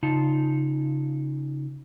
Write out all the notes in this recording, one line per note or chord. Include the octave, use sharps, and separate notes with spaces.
C#3 D#4 F4 A5